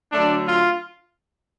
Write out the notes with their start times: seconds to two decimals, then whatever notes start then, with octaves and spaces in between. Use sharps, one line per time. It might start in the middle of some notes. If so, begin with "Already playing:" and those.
0.12 D3 F#3 A3 D4
0.47 F4